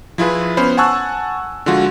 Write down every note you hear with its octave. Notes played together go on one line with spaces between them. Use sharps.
F3 E4 F4 G#4 B4
B3 C#4 C5 B5
F#5 G#5 A5 C#6 E6 F#6
D3 F3 G#3 F4 F#4